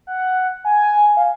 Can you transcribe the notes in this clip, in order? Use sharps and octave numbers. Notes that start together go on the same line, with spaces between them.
F#5
G#5
F5